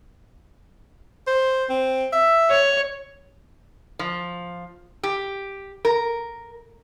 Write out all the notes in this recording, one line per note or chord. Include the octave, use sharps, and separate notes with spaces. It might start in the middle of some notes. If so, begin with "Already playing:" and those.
C5
C4
E5
C#5
F3
G4
A#4